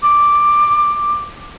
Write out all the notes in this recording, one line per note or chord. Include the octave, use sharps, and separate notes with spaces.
D6